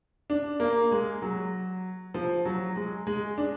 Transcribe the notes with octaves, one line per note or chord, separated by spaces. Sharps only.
D4
A#3
G#3
F#3
F3
F#3
G#3
G#3
D4